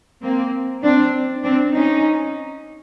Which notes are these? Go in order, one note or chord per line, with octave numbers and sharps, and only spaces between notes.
A#3 C4
C4 D4
C4 D4
C#4 D#4